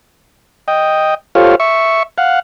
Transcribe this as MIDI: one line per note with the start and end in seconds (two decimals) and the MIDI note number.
0.68 1.14 75
0.68 1.14 79
1.35 1.55 65
1.35 1.55 67
1.35 1.55 69
1.35 1.55 72
1.35 1.55 73
1.35 1.55 77
1.60 2.03 76
1.60 2.03 85
2.18 2.39 77
2.18 2.39 78